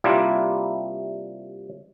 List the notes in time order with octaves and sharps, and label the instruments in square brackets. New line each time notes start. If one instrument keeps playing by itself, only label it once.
[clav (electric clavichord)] C3 G3 A#3 D4 E4 F4